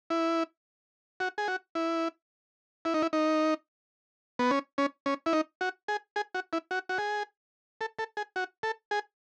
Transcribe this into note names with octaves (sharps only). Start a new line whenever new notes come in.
E4
F#4
G#4
F#4
E4
E4
D#4
E4
D#4
B3
C#4
C#4
C#4
E4
D#4
F#4
G#4
G#4
F#4
E4
F#4
F#4
G#4
A4
A4
G#4
F#4
A4
G#4